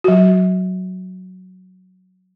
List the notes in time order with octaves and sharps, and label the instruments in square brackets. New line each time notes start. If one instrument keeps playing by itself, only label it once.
[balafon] F#3 F#4